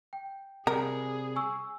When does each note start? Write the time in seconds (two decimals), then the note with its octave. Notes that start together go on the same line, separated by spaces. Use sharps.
0.13 G5
0.67 C3 G3 G#4 A#4
1.36 G#5 C#6 E6